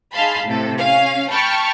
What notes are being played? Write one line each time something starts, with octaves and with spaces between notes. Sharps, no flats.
D#4 G#4 F5 A5 B5 C6
A2 C3 A4
C#4 F5
G5 A5 B5 C#6 F6